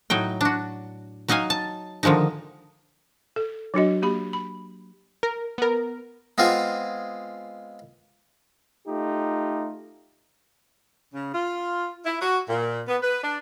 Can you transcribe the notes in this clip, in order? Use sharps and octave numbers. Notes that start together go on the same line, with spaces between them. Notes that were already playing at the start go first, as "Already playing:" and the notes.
A2 F#3 D#4 G5
D4 F#4
F#3 D#4 D#5 F5 G#5
A5
D3 D#3 F3 G#3 D#4
A4
F#3 D4 F#4 D#5
A#3 G4 B5
B5
A#4
B3 A#4
G#3 B3 C4 F4 G#4
A3 D#4 F4 G4
C#3
F4
E4
F#4
A#2
B3
B4
D4